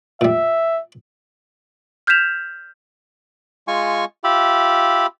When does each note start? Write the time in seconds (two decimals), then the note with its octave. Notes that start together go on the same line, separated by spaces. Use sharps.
0.21 A#2 G3 E5
2.07 F6 G6 G#6 B6 E7 F7
3.68 G#3 F4 G#5 C#6
4.24 F4 G4 E5 B5